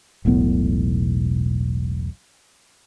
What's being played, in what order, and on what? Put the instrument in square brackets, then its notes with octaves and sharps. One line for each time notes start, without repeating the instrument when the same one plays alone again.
[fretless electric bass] E1 B1 A2 B3